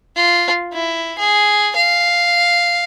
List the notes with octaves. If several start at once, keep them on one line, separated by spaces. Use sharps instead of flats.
F4
E4
G#4
F5